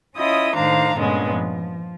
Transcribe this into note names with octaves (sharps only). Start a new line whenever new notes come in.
C#4 E4 F4 D#5 D#6
A2 D#3 D4 C5 F5 A#5
G2 A#2 D3 G#3 B3 C#4
F3